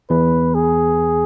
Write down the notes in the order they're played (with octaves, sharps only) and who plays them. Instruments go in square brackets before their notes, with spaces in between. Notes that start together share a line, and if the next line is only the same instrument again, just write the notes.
[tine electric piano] E2 [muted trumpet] B4
[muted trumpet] G#4